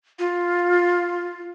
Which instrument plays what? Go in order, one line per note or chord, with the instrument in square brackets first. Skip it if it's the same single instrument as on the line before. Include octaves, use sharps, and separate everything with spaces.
[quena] F4